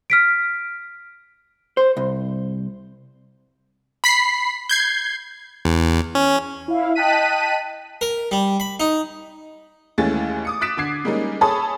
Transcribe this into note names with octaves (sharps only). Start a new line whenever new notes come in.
F6 B6 D7
C5
C2
B5 B6 C7
G6 G#6 C7
E2
C#4
E4 F5
D#5 G5 A5 F#6 B6 D#7
A#4
G3
B5
D#4
D#2 E3 G#3 A3 C#4 A6
D6 D#6 C#7
D#6 F#6 A6 B6 D7 E7
D3 D6 G#6 C7
G3 G#3 A#3 C#4 D#4
G#4 A4 C#5 A5 B5 D#6